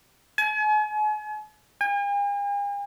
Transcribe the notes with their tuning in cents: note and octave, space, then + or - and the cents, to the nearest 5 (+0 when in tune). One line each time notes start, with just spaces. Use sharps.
G#5 +40
G#5 -45